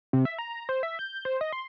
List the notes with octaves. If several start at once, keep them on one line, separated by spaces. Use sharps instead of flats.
C3
E5
A#5
C5
E5
G6
C5
D#5
C6